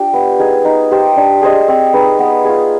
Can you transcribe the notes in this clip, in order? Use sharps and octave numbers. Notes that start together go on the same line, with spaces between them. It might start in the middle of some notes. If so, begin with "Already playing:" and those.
Already playing: D4 F4 G4
B3
D#4 G#4
D#4
G4 C5
D4
G#4 C5 D#5
C4
D#4 G#4 B4
B3
F4 G#4